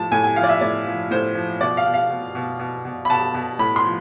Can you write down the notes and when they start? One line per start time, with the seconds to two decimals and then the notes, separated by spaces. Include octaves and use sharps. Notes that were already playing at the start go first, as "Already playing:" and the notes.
Already playing: A2 F3 A5
0.12 A2 G#5
0.24 G#5
0.36 F3 F5
0.43 D5
0.49 E5
0.61 A2 D5
0.86 F3
1.11 A2 C5
1.35 F3
1.61 B2 D5
1.77 F5
1.85 B2
1.94 F5
2.10 B2
2.35 B2
2.59 B2
2.85 B2
3.05 B5
3.10 B2 A5
3.34 B2
3.59 A2 B5
3.76 C6
3.84 F3